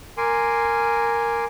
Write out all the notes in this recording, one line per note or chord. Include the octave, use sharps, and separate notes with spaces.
A#4 G#5 C6 D6